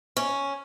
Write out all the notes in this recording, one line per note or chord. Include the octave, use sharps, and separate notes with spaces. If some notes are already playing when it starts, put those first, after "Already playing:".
C#4